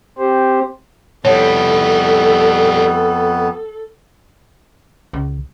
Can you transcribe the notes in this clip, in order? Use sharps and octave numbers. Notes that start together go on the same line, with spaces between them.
C4 G4 C5
F2 G3 B3 E4 A4 C#5
C#2